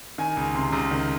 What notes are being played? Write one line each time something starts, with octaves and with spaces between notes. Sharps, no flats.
D#3 G#5
C#2
C3 C6
C#2 A#5
D#3